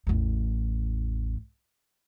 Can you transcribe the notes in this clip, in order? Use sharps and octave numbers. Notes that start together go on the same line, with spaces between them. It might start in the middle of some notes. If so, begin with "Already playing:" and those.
A1 E2